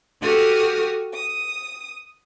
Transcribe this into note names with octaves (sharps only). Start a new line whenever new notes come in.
F#4 G4 A4 D#6 F6
D#6